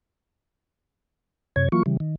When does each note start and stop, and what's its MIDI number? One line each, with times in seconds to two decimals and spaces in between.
1.56 1.69 42
1.56 1.69 48
1.56 1.69 73
1.56 1.69 92
1.72 1.83 52
1.72 1.83 54
1.72 1.83 58
1.72 1.83 65
1.72 1.83 85
1.86 1.97 49
1.86 1.97 52
1.86 1.97 55
2.00 2.16 51